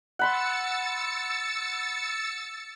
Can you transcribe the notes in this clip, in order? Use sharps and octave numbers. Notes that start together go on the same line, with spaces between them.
F#5 B5 C6 E6 A6 C#7